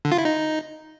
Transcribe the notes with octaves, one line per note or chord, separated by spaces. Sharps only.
D3
F4
E4
D#4